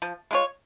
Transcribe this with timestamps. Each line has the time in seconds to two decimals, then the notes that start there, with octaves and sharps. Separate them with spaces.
0.02 F3
0.31 G#3 F4 C#5